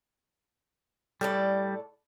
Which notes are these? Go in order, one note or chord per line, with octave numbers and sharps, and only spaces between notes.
A2 G3 A4 D5